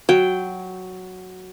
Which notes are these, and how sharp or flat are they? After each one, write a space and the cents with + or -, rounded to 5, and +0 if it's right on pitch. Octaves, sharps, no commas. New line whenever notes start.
F#3 +0 G5 -5